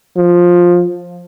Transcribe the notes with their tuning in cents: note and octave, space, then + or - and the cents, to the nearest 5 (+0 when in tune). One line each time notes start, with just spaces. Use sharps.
F3 +10